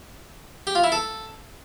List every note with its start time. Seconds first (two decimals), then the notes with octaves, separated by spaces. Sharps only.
0.67 G4
0.75 F4
0.84 E4
0.92 A4